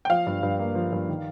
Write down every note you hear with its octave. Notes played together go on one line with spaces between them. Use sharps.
G5
F3 F5
G2
G2
A#3
F3
G2
D#3